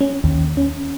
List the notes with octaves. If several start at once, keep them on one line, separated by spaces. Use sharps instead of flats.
C#4
D#2
C#4